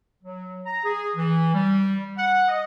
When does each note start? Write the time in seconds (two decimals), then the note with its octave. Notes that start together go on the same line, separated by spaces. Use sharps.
0.23 F#3
0.66 A#5
0.85 G#4
1.16 E3
1.54 G3
2.17 F#5
2.48 D#5